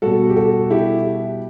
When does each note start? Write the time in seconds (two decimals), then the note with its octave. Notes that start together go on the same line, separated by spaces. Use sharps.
0.02 B2 G3 F#4 A4
0.30 G4
0.36 F#4 A4
0.70 E4 G4